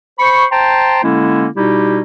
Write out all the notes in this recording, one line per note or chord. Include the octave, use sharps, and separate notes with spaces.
C5 B5 C#6
C5 G5 A5 A#5 C6
D3 G#3 A#3 C#4 E4
B2 G3 D#4 E4 G4